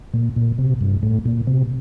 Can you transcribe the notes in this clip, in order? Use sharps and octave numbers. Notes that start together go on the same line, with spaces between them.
A#2
A#2
C3
G2
A2
A#2
C3